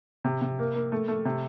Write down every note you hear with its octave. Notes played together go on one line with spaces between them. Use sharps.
C3
C3
A#3
A#3
A3
A3
C3